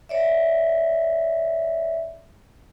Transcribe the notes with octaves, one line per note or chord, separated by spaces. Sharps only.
C#5 D5 E5